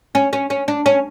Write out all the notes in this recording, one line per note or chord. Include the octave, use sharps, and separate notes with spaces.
C#4
C#4
C#4
D4
C#4